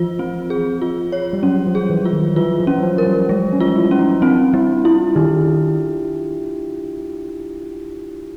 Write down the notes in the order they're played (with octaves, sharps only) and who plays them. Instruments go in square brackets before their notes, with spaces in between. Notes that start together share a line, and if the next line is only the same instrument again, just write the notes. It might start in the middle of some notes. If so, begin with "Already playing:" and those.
Already playing: [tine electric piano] E3 F3 [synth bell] F4
[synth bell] C4
G#4
F4
C#5
[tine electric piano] G3
[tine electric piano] F#3 [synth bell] C#4
[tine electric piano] F3
[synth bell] G#4
[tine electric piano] E3
[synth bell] F4
[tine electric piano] D#3
[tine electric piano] E3 [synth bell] F4
[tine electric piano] F3
[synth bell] C#4
[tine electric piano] F#3
F3
[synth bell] A#4
[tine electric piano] G3
[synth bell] G#3
[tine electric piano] C#4
[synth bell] F4
[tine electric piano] E4
[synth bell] C#4
[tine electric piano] D#4
[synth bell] C4 [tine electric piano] D4
[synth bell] G3 [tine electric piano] E4
[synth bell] E4 [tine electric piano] F4
[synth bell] D#3 [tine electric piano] G4